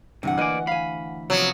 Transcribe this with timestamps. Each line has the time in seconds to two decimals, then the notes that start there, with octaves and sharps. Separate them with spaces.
0.23 D2 G2 C3 E3 F#5
0.37 A#3 B4 D5 D#5 G#5
0.67 F5 G#5 B5
1.30 C3 F3 F#3 B3